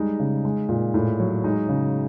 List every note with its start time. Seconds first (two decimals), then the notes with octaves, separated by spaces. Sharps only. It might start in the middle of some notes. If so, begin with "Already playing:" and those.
Already playing: G3 G#3 D#4
0.20 C#3
0.45 G#3
0.69 A#2
0.94 A2
1.20 F#3
1.44 G#3 D#4
1.69 C#3